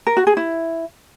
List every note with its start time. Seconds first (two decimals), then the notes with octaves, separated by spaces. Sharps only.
0.07 A#4
0.17 F#4
0.27 G#4
0.37 E4